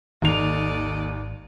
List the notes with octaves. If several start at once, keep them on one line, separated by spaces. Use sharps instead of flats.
G#1 D#2 A4 D5 D#5 F7